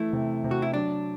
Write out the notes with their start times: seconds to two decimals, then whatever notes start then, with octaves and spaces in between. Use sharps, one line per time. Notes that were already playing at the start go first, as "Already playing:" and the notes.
Already playing: E3 A3 E4
0.13 C3
0.44 C3
0.51 F#4
0.62 E4
0.74 F#3 D4